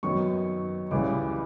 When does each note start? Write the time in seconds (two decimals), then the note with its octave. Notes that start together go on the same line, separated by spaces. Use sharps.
0.03 F#2 D#3 F#3 B3 C#6
0.91 C#2 C#3 E3 G3 D6